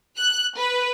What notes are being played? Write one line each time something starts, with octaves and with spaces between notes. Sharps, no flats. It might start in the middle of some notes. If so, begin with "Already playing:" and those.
F#6
B4